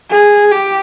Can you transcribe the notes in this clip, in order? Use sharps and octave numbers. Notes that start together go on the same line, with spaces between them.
G#4
G4